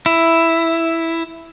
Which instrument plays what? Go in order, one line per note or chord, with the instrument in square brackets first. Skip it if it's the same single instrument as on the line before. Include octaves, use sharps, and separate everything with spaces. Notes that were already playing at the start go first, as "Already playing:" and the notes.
[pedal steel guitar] E4